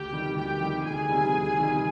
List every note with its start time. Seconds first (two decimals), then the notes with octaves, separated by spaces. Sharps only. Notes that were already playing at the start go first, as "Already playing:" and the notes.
Already playing: D2 G4 G5
0.12 C3 D#3 G3
0.37 D2 G4 G5
0.60 C3 D#3 G3
0.85 D2 G#4 G#5
1.09 C3 D#3 G3
1.34 D2
1.58 C3 D#3 G3